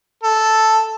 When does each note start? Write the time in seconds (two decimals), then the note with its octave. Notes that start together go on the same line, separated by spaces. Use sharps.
0.23 A4